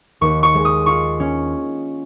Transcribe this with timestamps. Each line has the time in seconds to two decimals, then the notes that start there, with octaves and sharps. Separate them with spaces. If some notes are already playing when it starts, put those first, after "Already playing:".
0.21 D#2 C#6
0.43 C#6
0.54 G#3
0.65 D#6
0.86 F4 C#6
1.20 C#4